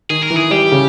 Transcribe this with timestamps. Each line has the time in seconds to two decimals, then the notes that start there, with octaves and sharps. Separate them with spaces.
0.10 D#3 G#4
0.23 A#4
0.30 E3
0.37 G#4
0.51 G3 G4
0.72 C#3